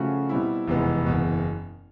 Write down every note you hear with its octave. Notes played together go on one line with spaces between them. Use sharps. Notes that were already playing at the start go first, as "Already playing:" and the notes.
Already playing: C#3 F3 A3 C#4 F#4
B2 G3 C4 E4
F1 E2 B2 G#3 B3
F#1 E2 B2